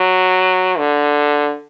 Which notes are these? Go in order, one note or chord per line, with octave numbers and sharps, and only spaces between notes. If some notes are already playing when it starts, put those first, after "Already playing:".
Already playing: F#3
D3